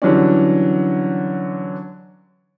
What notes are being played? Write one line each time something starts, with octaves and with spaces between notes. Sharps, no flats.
D3 E3 F#3 G3 C#4 D5